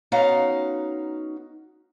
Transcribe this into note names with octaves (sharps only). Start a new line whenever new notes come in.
B3 C#4 D#4 F#4 F5 A#5